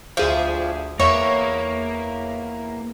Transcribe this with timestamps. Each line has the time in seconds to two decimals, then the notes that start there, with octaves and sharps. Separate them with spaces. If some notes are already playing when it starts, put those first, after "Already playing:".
0.17 D2 F3 G#4 E5
1.00 E2 A#3 C#5 E5